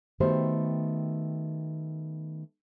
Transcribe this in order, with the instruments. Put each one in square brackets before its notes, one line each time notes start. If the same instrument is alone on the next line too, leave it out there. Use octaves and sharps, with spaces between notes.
[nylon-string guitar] D#3 A3 B3 F#4 G4 C5